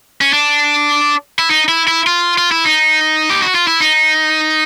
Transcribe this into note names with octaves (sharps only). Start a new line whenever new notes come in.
C#4
D4
E4
D#4
E4
E4
F4
F4
E4
D#4
G4
F#4
F4
E4
D#4